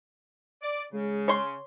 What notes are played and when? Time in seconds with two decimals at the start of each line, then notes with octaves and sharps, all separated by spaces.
0.63 D5
0.93 C#3 G#3
1.28 C#5 C6